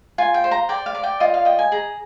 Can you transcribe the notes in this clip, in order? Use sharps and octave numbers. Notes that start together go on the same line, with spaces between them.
F4 G#5
G5
C5
A#5
D5 G5
F5
D5
G5
F4 D#5
F5
D#5 G5
G#5
G#4 A#5